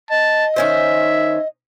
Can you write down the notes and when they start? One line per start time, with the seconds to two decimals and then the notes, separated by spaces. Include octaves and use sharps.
0.10 D#5 A5
0.56 D#3 C#4 C5 E5